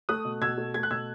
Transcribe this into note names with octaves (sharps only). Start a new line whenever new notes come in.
A3 D#6 F#6
B2
B2 E6 G#6
A3
A3 G#6
F#6
B2 E6 G#6